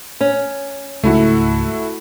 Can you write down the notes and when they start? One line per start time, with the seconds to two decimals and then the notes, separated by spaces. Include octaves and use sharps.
0.21 C#4
1.04 C#2 G#2 A3 E4 F#4